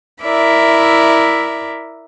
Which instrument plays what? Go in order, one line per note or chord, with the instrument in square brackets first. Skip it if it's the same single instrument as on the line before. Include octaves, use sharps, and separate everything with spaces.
[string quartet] E4 A#4 D5 E5